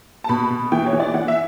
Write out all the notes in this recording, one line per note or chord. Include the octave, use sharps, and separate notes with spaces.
A5
B2 B5
B2
E3 G5
C#5
E3
D5
E3 F#5
E5